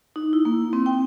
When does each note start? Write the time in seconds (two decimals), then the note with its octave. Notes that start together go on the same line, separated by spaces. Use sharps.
0.16 D#4
0.33 E4
0.45 A#3
0.73 C4
0.86 G5